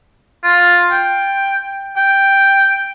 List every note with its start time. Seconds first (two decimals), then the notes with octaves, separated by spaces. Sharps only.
0.44 F4
0.91 G5
1.96 G5